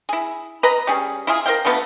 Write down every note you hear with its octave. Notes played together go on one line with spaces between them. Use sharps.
E4 G#4
B4 D#5 A#5
G3 C#4 G#4
E4 F4 G#4
A#4 C5 F5 G5
D3 F3 A3 B3